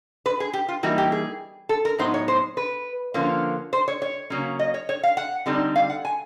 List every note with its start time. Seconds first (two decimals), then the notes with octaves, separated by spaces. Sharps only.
0.26 B4
0.40 G#4
0.54 G4
0.68 F4
0.83 E3 G3 A#3 D#4 F#4
0.98 G4
1.12 G#4
1.69 A4
1.85 A#4
1.98 A2 F#3 B3 D#4 C5
2.14 C#5
2.28 C5
2.57 B4
3.14 D3 F3 A#3 C#4
3.73 C5
3.88 C#5
4.02 C#5
4.30 C#3 F#3 A#3 C#4
4.59 D#5
4.74 C#5
4.89 C#5
5.03 F5
5.17 F#5
5.46 D3 G3 C4 D#4
5.76 F5
5.90 F#5
6.05 G#5